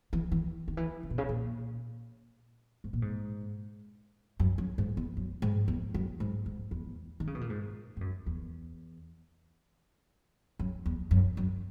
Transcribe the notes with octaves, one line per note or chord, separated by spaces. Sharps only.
E3
E3
D#3
E3
C#3
B2
C#3
A#2
G#2
A#2
G#2
F#2
F#2
G#2
E2
F#2
G#2
E2
F#2
G#2
G#2
E2
D#3
C#3
B2
A#2
G#2
G#2
F#2
E2
F#2
E2
F#2
F#2